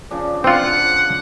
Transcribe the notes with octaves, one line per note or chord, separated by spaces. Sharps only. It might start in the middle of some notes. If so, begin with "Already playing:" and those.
C#3 F3 D4
C4 F4 F#5